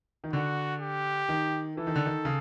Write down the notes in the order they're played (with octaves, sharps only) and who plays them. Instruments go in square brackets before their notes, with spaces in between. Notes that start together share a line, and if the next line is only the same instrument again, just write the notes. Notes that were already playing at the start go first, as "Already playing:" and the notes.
[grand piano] D#3
[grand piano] D3 [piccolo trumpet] F#4
[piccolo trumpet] G4
[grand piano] D#3
[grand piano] E3 [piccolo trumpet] A4
[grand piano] D#3
D3
D#3
C#3